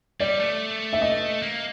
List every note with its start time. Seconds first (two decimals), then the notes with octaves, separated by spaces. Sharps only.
0.20 G3 D5
0.40 A3
0.93 E5
1.02 D#5
1.42 A#3